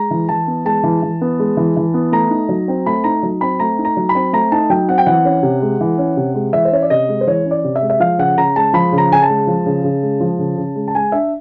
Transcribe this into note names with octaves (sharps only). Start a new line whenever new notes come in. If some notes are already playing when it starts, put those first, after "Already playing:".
Already playing: G#3 A#5
E3
E3 A5
B3
G#3 A5
E3
E3
B3
G#3
E3
E3
B3
A3 A#5
D#4
F#3
C4
A3 B5
D#4 A#5
F#3
C4 B5
A3 A#5
D#4
A#5
F#3
B5
C4
A3 A#5
D#4 A5
F#3 G5
C4 F#5
G5
E3 F#5
C#4
C3
G#3
E3
C#4
C3
G#3
E3 E5
C5
C#4 C#5
D5
C3 D#5
G#3
C5
E3 C#5
C#4
D5
C3
E5
G#3
E5
F3 F5
C#3 F#5
C#3 A#5
G#3 A5
F3 B5
C#3
A#5
C#3 G#5
A5
G#3
F3
C#3
C#3
G#3
F3
C#3
C#3
G#3
A5
G#3 G#5
D4 E5